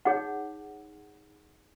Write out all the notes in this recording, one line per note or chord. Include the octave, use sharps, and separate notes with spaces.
D#4 G#4 C#5 F#5